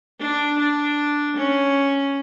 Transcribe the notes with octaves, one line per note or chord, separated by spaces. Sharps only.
D4
D4
C#4